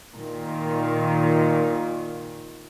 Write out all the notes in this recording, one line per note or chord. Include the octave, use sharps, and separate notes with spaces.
A#2 D#3